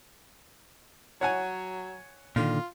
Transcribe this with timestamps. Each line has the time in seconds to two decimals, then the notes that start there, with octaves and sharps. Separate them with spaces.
1.21 F#3 C#5 F#5 G#5
2.36 A#2 D3 D#3 F4